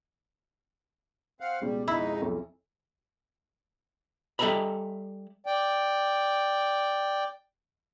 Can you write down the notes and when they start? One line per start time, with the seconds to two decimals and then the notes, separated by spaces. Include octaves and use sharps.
1.40 C4 F5 F#5
1.62 C#2 B2 G3
1.88 F2 G#3 D#4 E4
2.22 B1 F2
4.39 G3 A4 D#5 E5 A#5 B5
5.46 D5 G5